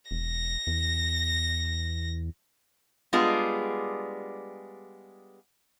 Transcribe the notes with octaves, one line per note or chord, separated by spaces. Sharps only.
E1 A#6
E2
G3 G#3 B3 D4 F4 G#4